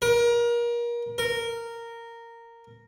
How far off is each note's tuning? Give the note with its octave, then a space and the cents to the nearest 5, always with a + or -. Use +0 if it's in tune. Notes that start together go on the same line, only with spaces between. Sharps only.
A#4 +30
A#4 -10